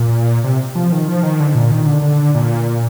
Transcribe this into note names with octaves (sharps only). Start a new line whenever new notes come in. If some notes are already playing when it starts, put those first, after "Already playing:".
Already playing: A#2
C3
F3
D#3
F3
D#3
D3
A#2
D#3
D3
D3
A#2